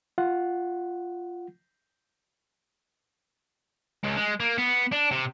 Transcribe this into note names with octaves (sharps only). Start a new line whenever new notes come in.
F4 F#5
C#2
G#3
A#3
B3
D4
C3